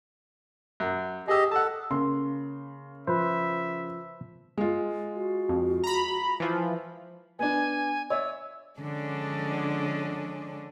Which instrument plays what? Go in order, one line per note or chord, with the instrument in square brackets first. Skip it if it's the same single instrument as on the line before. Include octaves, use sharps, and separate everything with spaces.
[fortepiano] F#2
[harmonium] G4 D#5 [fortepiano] G#4 E6
[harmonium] A4 [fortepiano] F#5 A5
[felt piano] C#3 A#3 [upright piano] C6
[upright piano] F3 [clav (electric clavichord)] B4 C5 [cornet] E5
[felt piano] G#3 F4
[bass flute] F#4
[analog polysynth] F2
A#5 B5
E3 F3
[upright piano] B3 D4 [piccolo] G#5
[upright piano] C#5 D5 E5 [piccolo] E6
[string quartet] D3 F3 G#3 C#4 D4